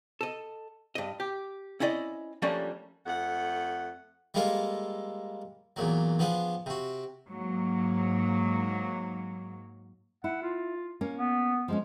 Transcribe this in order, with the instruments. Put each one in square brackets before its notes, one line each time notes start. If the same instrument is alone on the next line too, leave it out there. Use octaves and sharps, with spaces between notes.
[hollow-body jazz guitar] A4 D#5
G2 D#5
G4
C4 C#4 E4 D5 D#5
F3 G3 A3 A#3 C#4 D4
[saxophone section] F2 A3 F#5
[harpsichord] G3 G#3 A#3 F4 A4
E2 A#2 F#3
F3 B3 D4 G#4
C3 F#4
[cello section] G#2 F#3 A#3
[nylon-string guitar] E4 [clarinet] F#5
[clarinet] F4
[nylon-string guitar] A#3 C#4
[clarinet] B3
[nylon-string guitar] F3 G#3 C#4